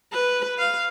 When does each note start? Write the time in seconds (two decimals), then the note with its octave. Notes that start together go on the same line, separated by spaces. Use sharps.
0.13 B4
0.58 F5